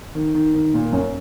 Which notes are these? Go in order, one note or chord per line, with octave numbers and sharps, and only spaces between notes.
D#3
D#3
D#3
A#2
F#2